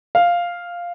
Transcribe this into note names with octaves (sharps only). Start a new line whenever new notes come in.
F5